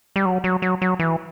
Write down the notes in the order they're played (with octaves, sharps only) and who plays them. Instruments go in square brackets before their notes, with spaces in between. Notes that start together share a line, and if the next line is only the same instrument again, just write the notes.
[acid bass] G3
F#3
F#3
F#3
F#3
E3